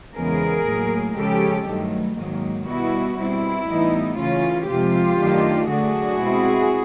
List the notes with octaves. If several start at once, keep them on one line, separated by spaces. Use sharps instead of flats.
E2 C#3 E3 G#3 B3 G#4 A#4
A2 F#3 A#3
C#3 F3 G#3 C#4 G4 A4
G2 D#3 F#3 A3
G#2 D#3 F#3 A#3
B2 G3 B3 E4 F#4
B2 G3 C4 E4
A2 E3 G3 B3 D#4
C#3 E3 A3 C#4 F4
F2 C3 F3 G#3 F4 G4
F#2 D#3 F#3 A3 D4
D3 F#3 A3 D4 F#4 G#4
B2 G#3 C4 E4